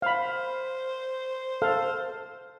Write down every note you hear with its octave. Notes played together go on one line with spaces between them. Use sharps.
C5 F5 B5
A4 F5